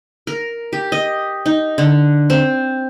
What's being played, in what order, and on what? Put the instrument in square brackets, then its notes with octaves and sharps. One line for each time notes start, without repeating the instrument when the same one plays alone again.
[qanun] A#4
G4
D#5
D#4
D3
C4